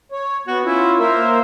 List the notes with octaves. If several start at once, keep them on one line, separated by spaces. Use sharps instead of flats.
C#5
B3 F#4
C#4 E4 F4
A#3 A#4 C5 E5